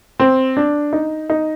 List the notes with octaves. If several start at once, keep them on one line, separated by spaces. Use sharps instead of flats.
C4
D4
D#4
D#4